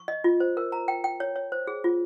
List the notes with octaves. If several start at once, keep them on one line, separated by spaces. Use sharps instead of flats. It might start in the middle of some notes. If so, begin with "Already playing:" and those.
Already playing: C#6
D#5
F4
C5
A#4
A#5
G5
G5
C#5
C#5
C5
G#4
F4